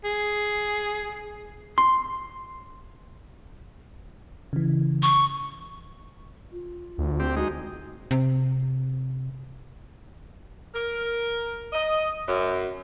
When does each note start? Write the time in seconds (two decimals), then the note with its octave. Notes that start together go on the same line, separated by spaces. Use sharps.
0.04 G#4
1.78 C6
4.53 C#3 E3
5.03 C#6
6.52 F4
6.98 D2
7.20 C4 G4
7.36 G#3 D#4 F#4
8.11 C3
10.75 A#4
11.73 D#5
12.27 F#2